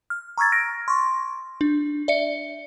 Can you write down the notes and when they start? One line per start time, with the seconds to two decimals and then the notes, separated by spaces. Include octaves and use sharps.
0.10 F6
0.38 A#5 C#6 E6 G#6 A6
0.52 F6 A#6 D7
0.88 C6 C#6
1.61 D4
2.08 D5 E5 C#7